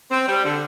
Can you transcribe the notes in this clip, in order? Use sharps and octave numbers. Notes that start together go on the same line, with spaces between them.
C4
G3
D3